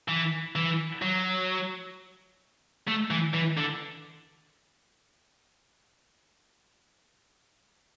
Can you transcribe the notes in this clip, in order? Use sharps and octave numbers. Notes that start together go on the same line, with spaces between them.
E3
E3
F#3
A3
E3
E3
D3